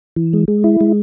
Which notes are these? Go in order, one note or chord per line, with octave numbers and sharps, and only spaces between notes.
E3
G#3
G#3
E4
G#3